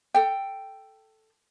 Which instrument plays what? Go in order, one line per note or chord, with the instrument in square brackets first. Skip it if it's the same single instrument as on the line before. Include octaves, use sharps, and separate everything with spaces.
[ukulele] A4 G5